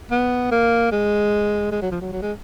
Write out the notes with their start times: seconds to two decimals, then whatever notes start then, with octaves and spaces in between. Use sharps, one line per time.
0.11 B3
0.51 A#3
0.92 G#3
1.72 G#3
1.82 F#3
1.92 F3
2.01 F#3
2.12 F#3
2.22 G#3